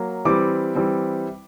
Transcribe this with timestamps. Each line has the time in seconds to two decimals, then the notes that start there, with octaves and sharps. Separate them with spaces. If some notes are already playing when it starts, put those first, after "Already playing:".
Already playing: F#3 A#3
0.25 E3 G3 C4 D6
0.75 E3 G3 C4